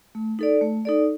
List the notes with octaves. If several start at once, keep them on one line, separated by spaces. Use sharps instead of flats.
A3
D#4 A4 D5
A3
D#4 A4 D5